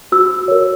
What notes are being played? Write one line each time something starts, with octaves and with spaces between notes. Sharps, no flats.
F#4 E6
A#4 C#5